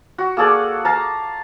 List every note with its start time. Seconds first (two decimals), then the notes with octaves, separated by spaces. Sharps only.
0.18 F#4
0.37 A#3 G#4 A4 D5
0.85 F5 A5 A#5